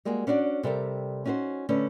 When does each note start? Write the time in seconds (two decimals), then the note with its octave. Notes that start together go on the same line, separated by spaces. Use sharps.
0.05 G3 G#3 A#3 F#4 G#4
0.27 C#4 D4 E4 F#4 D5
0.63 C3 G3 A4 A#4
1.25 C#4 D#4 F#4 B4 C5
1.69 D3 A3 C#4 B4